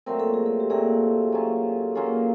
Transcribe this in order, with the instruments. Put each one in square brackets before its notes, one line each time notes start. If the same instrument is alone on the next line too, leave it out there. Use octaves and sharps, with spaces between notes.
[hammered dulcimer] A#2 F#3 A3 C4 [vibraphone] A#4
[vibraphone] A4
G#4
A4
G4
[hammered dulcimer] A#2 F#3 A3 C4 [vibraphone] G#4
[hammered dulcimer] F#3 A#3 C#4 F4
F#3 A#3 C#4 F4